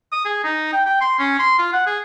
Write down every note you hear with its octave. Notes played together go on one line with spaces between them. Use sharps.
D#6
G#4
D#4
G5
G5
C6
C#4
C6
F4
F#5
G#4